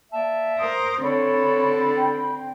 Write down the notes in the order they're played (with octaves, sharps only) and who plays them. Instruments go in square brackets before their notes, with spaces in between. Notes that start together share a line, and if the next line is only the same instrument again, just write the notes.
[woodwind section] A#3 D5 E5 [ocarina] A5
[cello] A#4 C5 [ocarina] D#6
[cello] D3 C4 [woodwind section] D4 A4 [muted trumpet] C#5 [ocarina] B5
[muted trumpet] G5